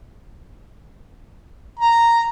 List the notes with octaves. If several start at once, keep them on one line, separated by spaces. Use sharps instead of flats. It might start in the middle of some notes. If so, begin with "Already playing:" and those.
A#5